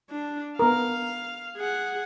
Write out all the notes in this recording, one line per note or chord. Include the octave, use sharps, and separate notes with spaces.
D4
B3 A#4 F5
G#4 F#5